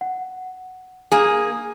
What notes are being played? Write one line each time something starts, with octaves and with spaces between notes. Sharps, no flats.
F#5
A#3 G#4 G#5